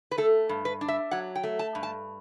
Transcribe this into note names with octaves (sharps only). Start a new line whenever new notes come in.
B4
A3 A4
G2
B4
D4
E5
F#3 F#5
G5
A3
A5
G2
A5